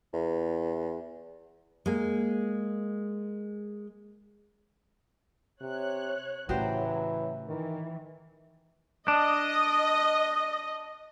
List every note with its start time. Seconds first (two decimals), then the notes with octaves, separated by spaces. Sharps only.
0.13 E2
1.86 G#3 A#3
5.61 C3 C#5 F#6
6.49 A2 C#3 E3 F#3 F#4 G4 C5
7.48 D#3 E3
9.08 D4 D#5